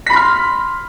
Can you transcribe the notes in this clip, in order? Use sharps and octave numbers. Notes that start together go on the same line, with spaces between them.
B5 C6 F6 B6